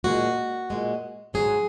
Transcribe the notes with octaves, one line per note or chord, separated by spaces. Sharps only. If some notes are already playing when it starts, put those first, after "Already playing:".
A#2 G#3 F#4
A#2 G#3
G#2 F#3 G#4